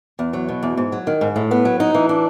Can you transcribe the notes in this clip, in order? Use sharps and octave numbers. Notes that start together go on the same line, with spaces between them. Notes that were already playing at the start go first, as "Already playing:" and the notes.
E2
F#3
B2
E2
G#2
F#3
D#3
G#2
A2
B3
F#3
D#4
E3
D4